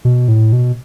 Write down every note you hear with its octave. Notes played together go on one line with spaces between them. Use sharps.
B2
A2
B2